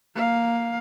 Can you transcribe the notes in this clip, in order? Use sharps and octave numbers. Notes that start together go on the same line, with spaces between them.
A#3 F5